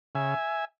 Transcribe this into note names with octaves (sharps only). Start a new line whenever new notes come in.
C#3 E5 G#5